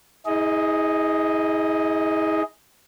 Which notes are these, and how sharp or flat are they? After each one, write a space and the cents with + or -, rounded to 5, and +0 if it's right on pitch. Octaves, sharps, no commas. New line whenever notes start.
E4 -45 G#4 +0 D#5 +0